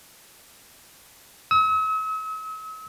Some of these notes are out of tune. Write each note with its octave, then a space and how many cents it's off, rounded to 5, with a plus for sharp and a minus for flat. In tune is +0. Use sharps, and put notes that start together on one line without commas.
E6 -45